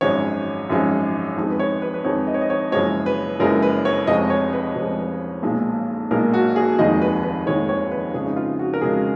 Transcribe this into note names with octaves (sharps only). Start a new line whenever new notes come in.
G#1 F#2 F3 G#3 C#5
G#1 F#2 F3 G#3
F2 D#3 G#3
B4
C#5
B4
B4
F2 D#3 G#3 C#5
D#5
C#5
D#5
C#5
F#1 F#2 F3 G#3 C#5
B4
F#1 F#2 F3 G#3 A#4
B4
C#5
F1 F2 F3 G#3 D#5
C#5
B4
F1 F2 F3 G#3
B1 A#2 G#3
B1 A#2 G#3 A#4
F#4
G#4
F1 D#2 D#3 G#3 D#5
B4
B4
F1 D#2 D#3 G#3 C#5
C#5
B4
F2 C#3 G#3 G#4
D#4
F4
F#4
A#4
F2 C#3 G#3 G#4